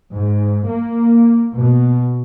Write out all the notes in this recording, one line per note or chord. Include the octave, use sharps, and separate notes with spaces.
G#2
A#3
B2